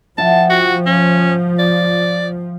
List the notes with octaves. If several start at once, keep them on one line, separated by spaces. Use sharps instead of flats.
F3 E5 F#5 G5 A5
F#4
C#4
D5